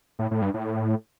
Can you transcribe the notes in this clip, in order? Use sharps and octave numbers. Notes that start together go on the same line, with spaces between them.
A2
A2
G2
A2